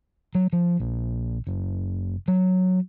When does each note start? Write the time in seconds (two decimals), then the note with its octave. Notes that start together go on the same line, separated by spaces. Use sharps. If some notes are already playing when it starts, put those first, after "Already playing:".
0.35 F#3
0.53 F3
0.80 A#1
1.47 F#1
2.28 F#3